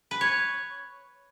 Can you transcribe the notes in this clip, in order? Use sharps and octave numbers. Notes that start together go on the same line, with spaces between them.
B4
C#5